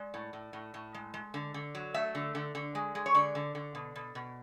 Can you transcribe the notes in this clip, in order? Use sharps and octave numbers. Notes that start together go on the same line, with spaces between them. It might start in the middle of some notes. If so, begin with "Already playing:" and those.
Already playing: G#3 D5
A2
A2
A2
A2
G#3
G#3
D3
D3
F#3
A3 E5
D3
D3
D3
G#3
G#3
C#5
D3 D5
D3
D3
B2
B2
B2